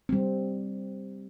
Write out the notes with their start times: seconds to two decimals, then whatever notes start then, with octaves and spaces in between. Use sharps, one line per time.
0.09 G3 C4